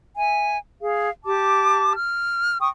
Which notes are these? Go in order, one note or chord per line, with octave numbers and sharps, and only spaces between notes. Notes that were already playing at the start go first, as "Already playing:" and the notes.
E5 G#5
G#4 F5
G4 A5 D6
F6
G5 C#6 D#6